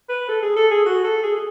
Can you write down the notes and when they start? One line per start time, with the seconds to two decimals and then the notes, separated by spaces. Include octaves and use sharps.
0.09 B4
0.29 A4
0.42 G#4
0.56 A4
0.71 G#4
0.85 F#4
1.04 A4
1.23 G#4
1.35 G#4